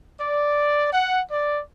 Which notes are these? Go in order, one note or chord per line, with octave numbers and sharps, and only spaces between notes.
D5
F#5
D5